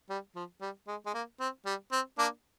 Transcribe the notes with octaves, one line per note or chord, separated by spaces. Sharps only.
G3
F3
G3
G#3
G#3
A#3
C4
G3
C4
A#3 D4